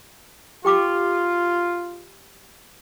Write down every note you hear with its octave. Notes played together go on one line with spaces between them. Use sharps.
F4 G4 G5 D6